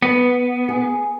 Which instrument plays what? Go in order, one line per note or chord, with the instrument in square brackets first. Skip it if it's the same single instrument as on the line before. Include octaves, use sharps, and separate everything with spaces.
[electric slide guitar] B3 [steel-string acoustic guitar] B4
[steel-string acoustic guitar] G#4